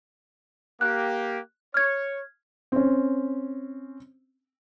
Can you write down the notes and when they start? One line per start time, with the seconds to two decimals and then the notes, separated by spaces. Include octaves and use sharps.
0.81 A#3 G4 F#6
1.74 C#5 F6 G#6
2.72 C4 C#4